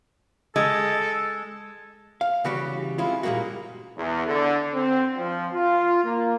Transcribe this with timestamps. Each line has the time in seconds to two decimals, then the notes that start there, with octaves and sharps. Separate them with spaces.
0.56 G#3 A4
2.21 F5
2.44 C#3 E3 G3 F#4 G4 C#5
2.98 G#3 C4 C#4 E4 F4
3.23 A#2 G3 G#3 A#3 F#4
3.97 E2
4.27 D3
4.73 C4
5.16 F3
5.53 F4
6.04 A#3